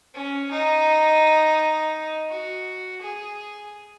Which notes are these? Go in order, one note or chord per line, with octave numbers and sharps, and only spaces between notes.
C#4
D#4
F#4
G#4